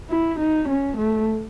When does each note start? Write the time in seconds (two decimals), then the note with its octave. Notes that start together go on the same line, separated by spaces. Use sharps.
0.10 E4
0.39 D#4
0.69 C#4
0.97 A3